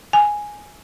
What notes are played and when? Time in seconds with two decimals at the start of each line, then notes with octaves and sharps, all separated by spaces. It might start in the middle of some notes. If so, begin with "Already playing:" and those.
0.13 G#5